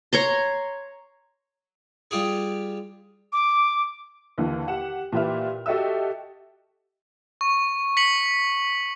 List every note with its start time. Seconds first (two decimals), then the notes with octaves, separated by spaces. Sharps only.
0.13 C#5 A#5 C6
2.11 G3 F4 G4 G#4
3.33 D6
4.38 D#2 D3 E3
4.68 G4 F#5 E7
5.12 A#2 E3 G4 B4 E5 F6
5.66 F#4 G4 A4 D#5 E5 E6
7.41 C#6
7.97 B6 C#7 F#7